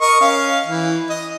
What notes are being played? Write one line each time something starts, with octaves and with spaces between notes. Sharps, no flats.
A#4 D#5 C#6
C#4 F5
E3
D#5